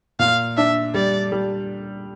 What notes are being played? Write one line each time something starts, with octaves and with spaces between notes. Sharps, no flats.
A#2 F5
D4 E5
G3 D5
G3